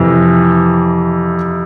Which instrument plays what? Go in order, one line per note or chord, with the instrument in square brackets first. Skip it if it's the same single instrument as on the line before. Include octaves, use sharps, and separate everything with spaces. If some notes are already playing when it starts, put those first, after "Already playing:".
Already playing: [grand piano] F2 C3 E3